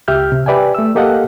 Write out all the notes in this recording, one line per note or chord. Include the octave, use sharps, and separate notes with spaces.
C#2 G4 E5 F6 G6
C3
G4 B4 D5 E5 G5 G#5
A3 E6
A#3 G4 A4 D#5 F5 F#5